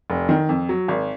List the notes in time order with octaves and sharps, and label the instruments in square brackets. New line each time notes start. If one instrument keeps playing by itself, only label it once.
[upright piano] F1
D#3
F2
F#3
G#1